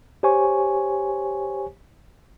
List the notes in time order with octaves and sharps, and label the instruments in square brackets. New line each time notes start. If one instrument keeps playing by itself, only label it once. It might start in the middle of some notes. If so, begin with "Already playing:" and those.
[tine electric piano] G4 C5 C#5 G#5 C#6